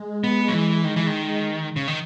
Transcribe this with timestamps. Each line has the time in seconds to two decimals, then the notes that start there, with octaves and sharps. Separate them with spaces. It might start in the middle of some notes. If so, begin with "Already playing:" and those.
Already playing: G#3
0.24 B3
0.48 F#3
0.54 E3
0.85 D#3
0.96 E3
1.07 D#3
1.76 C#3
1.88 D#3